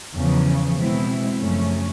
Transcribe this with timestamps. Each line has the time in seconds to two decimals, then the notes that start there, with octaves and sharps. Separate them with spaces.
0.15 E2 C#3 F3
0.77 B2 G#3 C4 E4
1.40 F#2 C#3 F3 A3 C#4